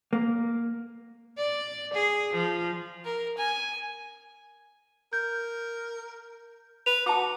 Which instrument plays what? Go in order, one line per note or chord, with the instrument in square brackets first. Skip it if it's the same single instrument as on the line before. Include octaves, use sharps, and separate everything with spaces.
[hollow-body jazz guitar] A#3
[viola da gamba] D5
G#4
F3
[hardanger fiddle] A#4
G#5
[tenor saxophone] A#4 [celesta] G6
[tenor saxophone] B4 [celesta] F7
[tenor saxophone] F#4 [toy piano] A5 D6